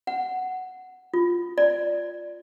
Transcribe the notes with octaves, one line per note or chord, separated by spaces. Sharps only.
F#5
F4
D5